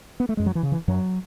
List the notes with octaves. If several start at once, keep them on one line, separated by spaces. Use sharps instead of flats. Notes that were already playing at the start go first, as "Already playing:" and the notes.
B3
A3
F#2 G#3
F#3
E3
C#3
E3
F#2 F#3